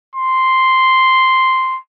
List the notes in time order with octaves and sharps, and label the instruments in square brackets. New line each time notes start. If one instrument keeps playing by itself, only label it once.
[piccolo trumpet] C6